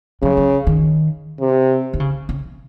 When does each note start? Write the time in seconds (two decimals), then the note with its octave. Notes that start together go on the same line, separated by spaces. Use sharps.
0.22 C#3 F#3
0.37 F#3
0.67 D#3
1.40 C3
1.93 D#3
2.00 C#3
2.29 C#3